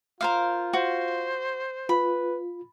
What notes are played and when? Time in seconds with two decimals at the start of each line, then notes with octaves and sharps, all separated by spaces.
0.21 F4 A#4 C5 F5
0.73 F#4 C5
1.89 F4 B4 B5